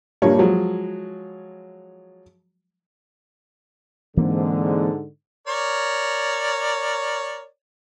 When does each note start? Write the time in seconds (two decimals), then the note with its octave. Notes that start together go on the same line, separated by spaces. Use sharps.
0.22 A#1 G2 G3 A#3 C#5
0.39 F3 F#3 G#3
4.17 G#2 D3 E3 A#3 C4
5.47 A#4 C#5 D5